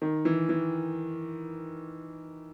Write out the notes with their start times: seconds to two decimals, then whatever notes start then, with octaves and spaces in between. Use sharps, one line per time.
0.02 D#3
0.25 E3
0.49 E3